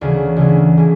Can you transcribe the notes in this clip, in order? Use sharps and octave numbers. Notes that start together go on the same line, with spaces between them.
D2 C#3 E3
D2 C#3 E3
C#3 E3